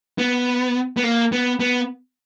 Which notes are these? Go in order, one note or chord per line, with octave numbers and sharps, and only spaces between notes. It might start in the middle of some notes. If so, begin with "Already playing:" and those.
B3
B3
A#3
B3
B3